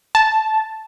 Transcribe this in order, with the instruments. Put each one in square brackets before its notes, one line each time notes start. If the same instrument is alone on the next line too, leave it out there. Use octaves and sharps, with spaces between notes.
[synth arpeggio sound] A5